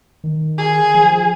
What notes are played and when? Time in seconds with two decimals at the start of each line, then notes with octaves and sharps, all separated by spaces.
0.24 D#3
0.58 G#4
0.95 F3